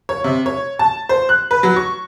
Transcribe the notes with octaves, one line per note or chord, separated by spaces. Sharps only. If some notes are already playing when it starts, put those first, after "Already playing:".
C#5
C3
C#5
A5
C5
F#6
B4
F#3
C#6